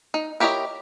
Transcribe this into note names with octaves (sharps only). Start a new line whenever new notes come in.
D#4
E4 G4 A#4 C#5 D#5